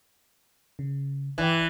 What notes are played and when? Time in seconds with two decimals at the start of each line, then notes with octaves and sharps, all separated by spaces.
0.79 C#3
1.38 G1 E3 D5 G5